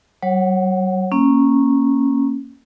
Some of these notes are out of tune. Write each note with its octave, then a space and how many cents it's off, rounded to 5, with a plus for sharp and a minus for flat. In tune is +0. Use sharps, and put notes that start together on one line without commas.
F#3 +45 C#5 -25 F#5 +0
A#3 +0 C#4 -10